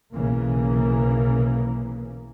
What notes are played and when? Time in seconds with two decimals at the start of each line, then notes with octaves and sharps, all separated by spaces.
0.13 B1 C#3 E3 A#3